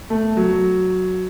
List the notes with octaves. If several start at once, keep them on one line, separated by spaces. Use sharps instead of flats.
A3
F#3